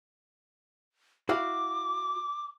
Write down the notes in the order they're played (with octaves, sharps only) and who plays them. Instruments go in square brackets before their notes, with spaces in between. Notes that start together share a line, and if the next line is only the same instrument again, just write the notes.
[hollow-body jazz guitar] E4 F#4 F5 [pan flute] D6